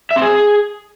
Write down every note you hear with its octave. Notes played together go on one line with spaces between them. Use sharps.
E5
C4
G#4